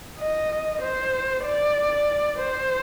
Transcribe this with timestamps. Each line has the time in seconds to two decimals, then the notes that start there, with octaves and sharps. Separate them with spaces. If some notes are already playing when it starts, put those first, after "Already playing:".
0.20 D#5
0.82 C5
1.45 D5
2.39 C5